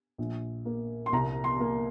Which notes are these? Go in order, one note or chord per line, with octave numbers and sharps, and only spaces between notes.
A#1
A#3
C6
C2 A#5
C6
A#3